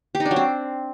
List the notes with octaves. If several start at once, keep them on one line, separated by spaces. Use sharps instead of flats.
G4
D#4
D4
F#3
C4